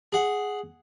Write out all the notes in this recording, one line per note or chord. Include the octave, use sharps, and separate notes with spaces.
G#4 F#5